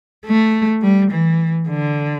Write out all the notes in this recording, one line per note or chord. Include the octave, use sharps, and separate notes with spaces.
A3
G3
E3
D3